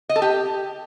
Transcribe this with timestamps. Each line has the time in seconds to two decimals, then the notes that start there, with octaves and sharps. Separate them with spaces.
0.09 D#5
0.16 A4
0.22 G4